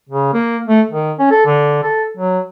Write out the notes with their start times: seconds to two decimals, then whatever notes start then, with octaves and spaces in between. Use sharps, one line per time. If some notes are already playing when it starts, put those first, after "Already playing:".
0.09 C#3
0.34 A#3
0.68 A3
0.91 D#3
1.19 C#4
1.31 A4
1.46 D3
1.83 A4
2.17 F#3